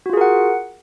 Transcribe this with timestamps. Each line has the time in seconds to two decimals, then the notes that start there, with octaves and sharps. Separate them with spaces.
0.06 F#4
0.10 F4
0.13 G#4
0.17 A#4
0.21 F#5